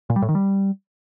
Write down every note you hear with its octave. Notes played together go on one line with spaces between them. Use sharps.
A#2
G3
A2
D#3
G3